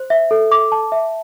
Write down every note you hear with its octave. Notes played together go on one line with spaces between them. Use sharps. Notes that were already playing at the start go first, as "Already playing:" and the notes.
Already playing: C5
E5
A4
D6
A5
E5